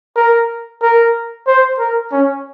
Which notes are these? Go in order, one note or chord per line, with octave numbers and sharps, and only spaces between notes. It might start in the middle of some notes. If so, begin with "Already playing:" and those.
A#4
A#4
C5
A#4
C#4